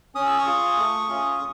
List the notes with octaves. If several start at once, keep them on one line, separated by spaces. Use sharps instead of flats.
C#4 D#6
E6
C#6 D#6
F4 G#4
A3
C#4 F4 G#4